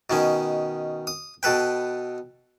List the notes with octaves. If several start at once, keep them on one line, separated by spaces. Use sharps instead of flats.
B2 D#3 C#4
D#6
B2 A4 B4 G5